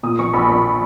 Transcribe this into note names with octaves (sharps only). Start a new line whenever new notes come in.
A#2 D#6
A#1 C#6
A#1 B5
A#1